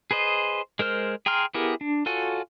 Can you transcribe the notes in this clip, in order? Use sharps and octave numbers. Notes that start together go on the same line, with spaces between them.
G#4 B4 C5 D#5
G#3 A#4 C5 F6
G#4 G5 A#5 C6 F6
B3 E4 G4 G#4 A#4
D4
F4 F#4 A4 C#5 G#5